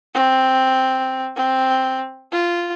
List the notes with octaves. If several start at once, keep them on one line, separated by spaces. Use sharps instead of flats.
C4
C4
F4